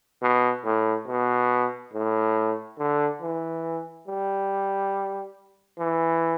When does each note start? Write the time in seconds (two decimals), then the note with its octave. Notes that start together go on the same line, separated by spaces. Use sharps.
0.22 B2
0.65 A2
1.07 B2
1.93 A2
2.78 D3
3.21 E3
4.07 G3
5.78 E3